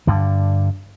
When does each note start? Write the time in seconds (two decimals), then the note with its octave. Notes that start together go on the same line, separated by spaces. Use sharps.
0.07 G2 D3